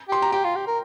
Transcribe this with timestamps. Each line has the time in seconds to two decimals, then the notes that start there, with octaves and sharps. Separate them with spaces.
0.09 G4 C6
0.22 A#5
0.32 G4 G5
0.44 F4
0.55 G4
0.67 A#4